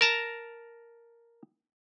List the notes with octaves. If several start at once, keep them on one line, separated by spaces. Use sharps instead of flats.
A#4 A5 A#5